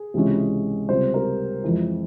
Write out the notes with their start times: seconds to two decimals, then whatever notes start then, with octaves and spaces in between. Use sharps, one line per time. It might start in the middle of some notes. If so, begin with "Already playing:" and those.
Already playing: G#4
0.14 C#2 C3 E3 G#3 C#4
0.89 C#2 C3 G3 C5
1.14 A#4
1.64 F2 E3 G#3